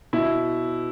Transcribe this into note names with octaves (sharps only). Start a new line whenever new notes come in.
B2 E4